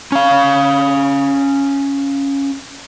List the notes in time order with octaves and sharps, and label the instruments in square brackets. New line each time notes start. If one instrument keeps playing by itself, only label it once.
[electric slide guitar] C#4 F5